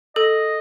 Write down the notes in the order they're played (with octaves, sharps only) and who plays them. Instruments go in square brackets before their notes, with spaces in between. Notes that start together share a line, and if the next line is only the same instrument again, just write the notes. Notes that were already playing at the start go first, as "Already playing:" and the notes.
[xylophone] A4 [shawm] D#5